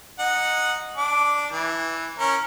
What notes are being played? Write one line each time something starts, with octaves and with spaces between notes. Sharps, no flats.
D#4 F#5
D4 D6
E3
C#4 A#4